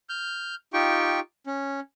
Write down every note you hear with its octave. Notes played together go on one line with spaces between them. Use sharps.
F6 G6
D#4 F4 G4 G5 C#6
C#4